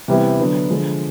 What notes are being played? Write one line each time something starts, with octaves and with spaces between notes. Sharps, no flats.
C3 E3 G3 B3 E4
D3 F#3 B3 D4
D3 F3 G#3